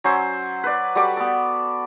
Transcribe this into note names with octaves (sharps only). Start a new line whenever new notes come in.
F#3 C#4 C5 E6
B4 D5
G3 F#4 A4 D6
B3 A4